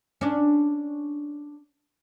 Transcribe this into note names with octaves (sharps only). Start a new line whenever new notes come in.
C#4 D4